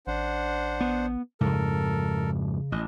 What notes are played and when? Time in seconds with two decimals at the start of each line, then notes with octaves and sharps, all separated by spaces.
0.07 A1 D4 C5 F#5
0.81 B3
1.41 F2 G#2 C#3 A4 A#4
2.72 A1 D#5